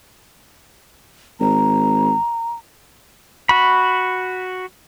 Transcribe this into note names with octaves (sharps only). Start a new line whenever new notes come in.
G#1 A#5
F#4 B5